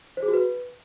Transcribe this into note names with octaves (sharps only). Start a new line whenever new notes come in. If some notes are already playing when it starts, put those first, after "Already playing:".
C5
G#4
F#4
B4